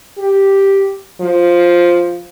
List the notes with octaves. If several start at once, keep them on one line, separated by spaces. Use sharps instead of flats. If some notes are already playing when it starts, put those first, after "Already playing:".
G4
F3